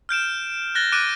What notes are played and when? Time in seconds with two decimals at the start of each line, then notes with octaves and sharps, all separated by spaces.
0.09 F6 G6 D7 E7
0.75 F#6 A6 A#6 G7
0.92 D6 F#6 A6 D7 D#7